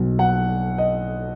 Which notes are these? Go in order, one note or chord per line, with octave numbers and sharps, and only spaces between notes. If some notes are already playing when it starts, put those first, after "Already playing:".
Already playing: B1 B2
F#5
D#5